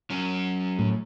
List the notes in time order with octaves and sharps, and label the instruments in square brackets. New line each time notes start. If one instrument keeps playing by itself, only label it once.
[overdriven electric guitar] F#3 C#4
[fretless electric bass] A2